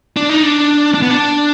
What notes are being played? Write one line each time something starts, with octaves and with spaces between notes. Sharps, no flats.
D4
D#4
D4
D4
B3
D4